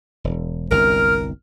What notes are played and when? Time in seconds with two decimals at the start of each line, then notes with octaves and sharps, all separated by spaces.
0.24 E1
0.71 G1 C2 F#2 A#4 F6